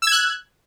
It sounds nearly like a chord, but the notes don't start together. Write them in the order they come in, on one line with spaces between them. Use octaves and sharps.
E6 G#6 F#6